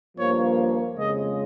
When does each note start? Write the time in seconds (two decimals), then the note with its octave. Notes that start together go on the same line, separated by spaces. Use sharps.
0.17 G2 F3 A#3 C#5
0.96 F2 C#3 G#3 D#5